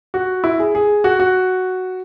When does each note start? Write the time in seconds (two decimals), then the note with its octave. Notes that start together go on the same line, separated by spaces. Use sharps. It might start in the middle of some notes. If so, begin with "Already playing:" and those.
0.14 F#4
0.44 E4
0.60 G#4
0.75 G#4
1.04 F#4
1.20 F#4